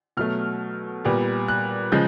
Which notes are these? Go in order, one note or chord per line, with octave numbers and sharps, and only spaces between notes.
B2 F#3 A3 F6
A#2 G3 B3
F#6
C#3 F3 G#3 G6